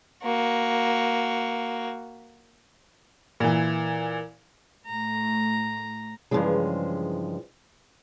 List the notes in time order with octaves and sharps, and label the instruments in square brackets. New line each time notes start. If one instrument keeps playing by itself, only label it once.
[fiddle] A#3 F#4
[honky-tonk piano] A#2 E3
[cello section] A2 A3 [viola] A#5
[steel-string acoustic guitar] G2 A#2 C#3 E3 F3 G#3